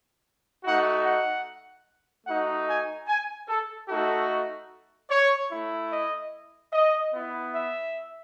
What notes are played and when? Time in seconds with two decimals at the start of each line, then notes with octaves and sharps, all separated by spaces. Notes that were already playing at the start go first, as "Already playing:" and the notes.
0.64 A3 D#4 F#4 F#5
1.05 F#5
2.27 A3 D#4 F#4 F#5
2.68 G#5
3.08 G#5
3.48 A4
3.89 A3 D#4 F#4 A4
5.10 C#5
5.51 A3 E4
5.92 D#5
6.73 D#5
7.14 B3 E4
7.54 E5